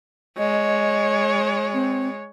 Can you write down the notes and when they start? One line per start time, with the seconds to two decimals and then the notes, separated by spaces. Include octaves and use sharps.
0.38 G#3 C#5 D#5
1.74 C4